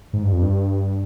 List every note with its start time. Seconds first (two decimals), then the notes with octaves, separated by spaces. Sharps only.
0.13 G#2
0.23 G2
0.33 F2
0.42 G2